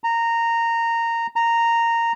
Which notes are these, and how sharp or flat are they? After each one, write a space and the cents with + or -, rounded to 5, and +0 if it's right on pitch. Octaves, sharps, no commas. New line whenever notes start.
A#5 -15
A#5 -10